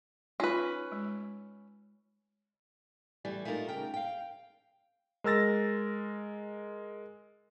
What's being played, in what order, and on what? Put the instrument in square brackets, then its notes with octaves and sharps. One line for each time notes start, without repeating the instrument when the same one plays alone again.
[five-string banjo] C#4 B4 [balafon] D#4 F4
[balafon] G#3
[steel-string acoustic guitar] E3 G3 A3
A3 A#3 D#4 F4 A#4
C#3 A#4 G5
F5 G5
[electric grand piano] G#3 A#4 E6 A6 A#6